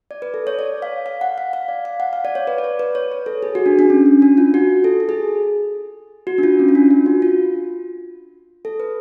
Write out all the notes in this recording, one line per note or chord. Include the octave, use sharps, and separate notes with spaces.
D5
B4
A4
C#5
D5
F5
F5
F#5
F5
F5
D5
F5
F#5
F5
D5
C#5
B4
D5
C#5
B4
C#5
B4
A4
G#4
F#4
D4
D4
C#4
C#4
D4
F4
F#4
A4
A4
G#4
F#4
D4
F4
C#4
F4
D4
F4
F#4
F4
A4
B4